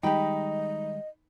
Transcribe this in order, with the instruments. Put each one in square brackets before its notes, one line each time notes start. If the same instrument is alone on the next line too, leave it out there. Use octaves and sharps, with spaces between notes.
[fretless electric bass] D#3 G3 G#3 [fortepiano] D#4 B5 [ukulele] G4 G5 [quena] D#5